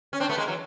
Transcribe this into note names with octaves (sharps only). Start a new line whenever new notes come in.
C#4
C4 D4
A3 B3
G#3 A#3
E3 F#3